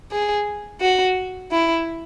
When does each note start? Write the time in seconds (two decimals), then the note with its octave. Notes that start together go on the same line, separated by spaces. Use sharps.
0.11 G#4
0.81 F#4
1.51 E4